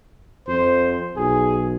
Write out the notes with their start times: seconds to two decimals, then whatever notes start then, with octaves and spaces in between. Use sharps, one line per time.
0.48 F2 C5
1.16 B1 G#4